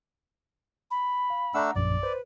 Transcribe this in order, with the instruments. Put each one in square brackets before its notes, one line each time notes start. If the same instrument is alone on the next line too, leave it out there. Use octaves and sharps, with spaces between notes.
[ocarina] B5
[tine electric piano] F5
[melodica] A3 D4 E6 [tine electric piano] F#5 A#5
[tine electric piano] A#1 F#2 [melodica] D5
[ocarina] B4 [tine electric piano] C5